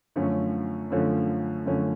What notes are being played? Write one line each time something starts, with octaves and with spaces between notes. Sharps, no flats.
F#2 D3 F3 A3 C#4
F#2 D3 F3 A3 C#4
F#2 D3 F3 A3 C#4